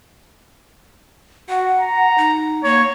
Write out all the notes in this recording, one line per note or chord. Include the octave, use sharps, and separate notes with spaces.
F#4 F#5
A#5
D#4
A#3 C#5